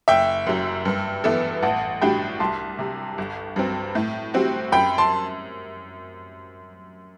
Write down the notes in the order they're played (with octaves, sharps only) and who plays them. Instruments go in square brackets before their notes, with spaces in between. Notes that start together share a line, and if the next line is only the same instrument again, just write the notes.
[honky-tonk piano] F#1 [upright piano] E5 G5
[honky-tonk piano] F#2 F#3
G2
E3 B3 E4 A4
[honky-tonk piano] A1 [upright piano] F#5 A5
[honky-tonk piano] A2 G3 D4 F#4 [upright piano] G5 B5
[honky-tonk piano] C2 [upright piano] A5 C6
[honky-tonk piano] C3 G3
G1
G2 F#3 C4
A2
G3 C4 F#4
[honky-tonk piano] F#2 [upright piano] G5 B5
[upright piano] A5 C6